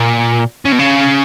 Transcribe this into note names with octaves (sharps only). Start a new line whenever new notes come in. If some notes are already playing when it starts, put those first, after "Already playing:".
Already playing: A#2
C#3
B2
C#3